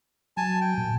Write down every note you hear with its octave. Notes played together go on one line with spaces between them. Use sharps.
F#3 G#5 A5
G5
A#2